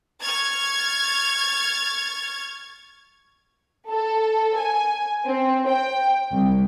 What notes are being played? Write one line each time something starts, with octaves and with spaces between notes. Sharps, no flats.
C#6 F6 G#6 A6
A4
G#5
C4
G5
C2